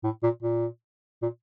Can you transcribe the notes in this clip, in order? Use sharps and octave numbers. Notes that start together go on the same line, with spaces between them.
A2
A#2
A#2
A#2